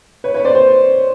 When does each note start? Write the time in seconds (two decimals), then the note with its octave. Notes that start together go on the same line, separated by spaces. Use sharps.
0.24 B4 C#5
0.34 B4 C#5
0.45 C5 D5
0.55 C5